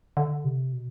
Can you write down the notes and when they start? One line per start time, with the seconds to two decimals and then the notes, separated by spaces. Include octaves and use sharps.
0.17 D3
0.44 C3
0.73 B2